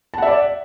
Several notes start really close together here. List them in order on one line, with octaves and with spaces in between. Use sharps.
A5 F#5 E5 D5